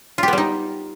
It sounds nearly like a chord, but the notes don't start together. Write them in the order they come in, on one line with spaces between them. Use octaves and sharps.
F4 G4 B3 G3 D#4